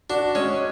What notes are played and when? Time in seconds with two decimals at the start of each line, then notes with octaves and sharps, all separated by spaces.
0.09 D4 F#4
0.35 G#3 C#4